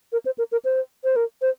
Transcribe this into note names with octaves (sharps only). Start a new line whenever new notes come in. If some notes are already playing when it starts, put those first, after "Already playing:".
A#4
C5
A#4
A#4
C5
C5
A#4
C5